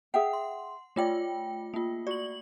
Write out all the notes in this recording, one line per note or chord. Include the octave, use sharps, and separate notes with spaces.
G#4 E5 F#5 G5
C6
A3 F4 C#5 D5 G5
A#3 F4
F#4 D5 F#7